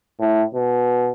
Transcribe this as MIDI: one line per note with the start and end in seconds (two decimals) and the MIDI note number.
0.20 0.43 45
0.55 1.11 47